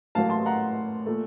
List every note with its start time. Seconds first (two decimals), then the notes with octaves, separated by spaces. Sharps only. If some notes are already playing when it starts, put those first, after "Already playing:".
0.15 A1 A2 F#3 A#3 F5 A5
0.30 A5 C6
0.46 F#5 A#5
1.06 A#2 A3